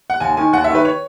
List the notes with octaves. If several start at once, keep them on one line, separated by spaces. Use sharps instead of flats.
F#5
D#2 G#5
D#3 G#5
D#2 F#5
E5
D#3
B4
C#5